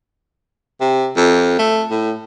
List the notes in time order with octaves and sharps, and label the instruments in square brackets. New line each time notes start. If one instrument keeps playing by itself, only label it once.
[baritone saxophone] C3
F2
A3
A2